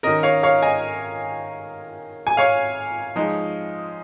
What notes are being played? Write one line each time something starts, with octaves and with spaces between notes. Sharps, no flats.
D#3 C#4 A#4 D#5
C#5 F5
C#5 F5
D#5 G#5
G#5
C#5 F5
F3 G#3 D#4